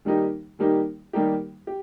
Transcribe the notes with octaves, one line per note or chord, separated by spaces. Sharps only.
D#3 G3 A#3 D#4 G4
D#3 G3 A#3 D#4 G4
D#3 G3 A#3 D#4 G4
G4